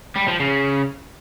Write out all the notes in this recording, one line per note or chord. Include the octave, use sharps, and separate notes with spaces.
G3
F3
C#3